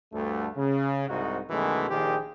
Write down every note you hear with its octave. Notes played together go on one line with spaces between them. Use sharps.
D2 G2 A3
C#3
C2 G#2 D#4 F#4
F#2 B2 D#3 E3 G#3 A3
A#1 A#2 D#3 G4 G#4 C5